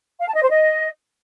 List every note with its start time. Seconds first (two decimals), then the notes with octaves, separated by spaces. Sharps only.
0.20 F5
0.27 A5
0.35 D#5
0.43 C5
0.50 D#5